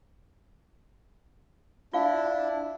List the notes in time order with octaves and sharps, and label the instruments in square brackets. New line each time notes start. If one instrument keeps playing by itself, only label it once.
[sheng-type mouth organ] D4 E4 [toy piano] F4 F5